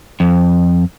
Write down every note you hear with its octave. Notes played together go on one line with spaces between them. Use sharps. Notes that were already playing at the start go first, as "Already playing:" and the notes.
F2